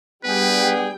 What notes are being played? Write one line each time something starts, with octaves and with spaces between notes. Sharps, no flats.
G3 B3 D4 G#4 B4 G5